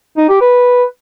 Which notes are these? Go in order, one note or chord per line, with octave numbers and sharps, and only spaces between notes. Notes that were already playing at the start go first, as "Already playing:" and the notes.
D#4
G4
B4